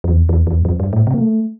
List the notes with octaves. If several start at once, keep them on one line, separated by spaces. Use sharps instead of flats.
F2
E2
E2
E2
G2
F2
G2
A2
C3
A#3
A3